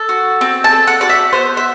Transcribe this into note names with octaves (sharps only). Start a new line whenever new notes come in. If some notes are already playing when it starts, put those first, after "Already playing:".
Already playing: A4
F#4
C4
A5
A4
F#5
F#4 D5
E5
B3 C5
E5